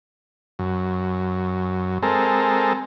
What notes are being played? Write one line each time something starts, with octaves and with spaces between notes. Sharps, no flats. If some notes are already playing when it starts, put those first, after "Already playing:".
F#2
G#3 C4 A4 A#4